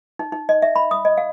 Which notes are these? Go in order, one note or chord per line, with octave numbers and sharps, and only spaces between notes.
D#4
D#4
D#5
E5
B5
D#6
D#5
F5